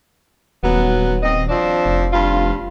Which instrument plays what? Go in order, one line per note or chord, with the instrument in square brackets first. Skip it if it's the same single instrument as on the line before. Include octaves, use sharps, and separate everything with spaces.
[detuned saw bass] D#1 [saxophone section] F#3 B3
[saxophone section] C4 D#5
F3 C4 D4
[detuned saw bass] F1
[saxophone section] G2 F4